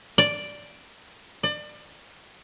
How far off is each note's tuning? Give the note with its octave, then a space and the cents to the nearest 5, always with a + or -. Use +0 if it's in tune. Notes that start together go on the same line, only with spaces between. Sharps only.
D5 +0
D5 +30